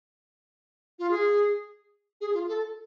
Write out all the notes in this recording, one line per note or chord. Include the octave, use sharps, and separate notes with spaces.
F4
G#4
G#4
F4
A4